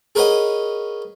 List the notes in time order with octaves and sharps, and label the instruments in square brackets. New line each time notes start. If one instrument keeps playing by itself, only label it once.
[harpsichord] G#4 A#4 B4 C#5 D#5 F#5